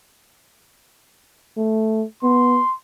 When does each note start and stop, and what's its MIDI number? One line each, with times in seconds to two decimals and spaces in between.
1.57 2.04 57
2.23 2.60 59
2.23 2.74 84